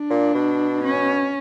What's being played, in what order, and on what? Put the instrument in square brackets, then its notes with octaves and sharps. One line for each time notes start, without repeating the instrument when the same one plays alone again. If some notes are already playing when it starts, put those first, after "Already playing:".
Already playing: [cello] D4
[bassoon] A#2
B2
[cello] C#4